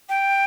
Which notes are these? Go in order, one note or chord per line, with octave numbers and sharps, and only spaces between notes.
G5